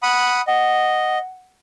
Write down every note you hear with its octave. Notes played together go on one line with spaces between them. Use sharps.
F#5 B5 D#6
D#5 F#5